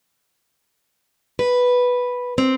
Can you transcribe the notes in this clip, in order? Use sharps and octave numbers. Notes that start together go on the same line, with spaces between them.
B4
C4